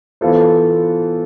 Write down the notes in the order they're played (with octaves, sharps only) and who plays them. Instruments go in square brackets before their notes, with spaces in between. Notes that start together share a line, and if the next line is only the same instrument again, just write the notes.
[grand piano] E3 B3 F4 A4 C5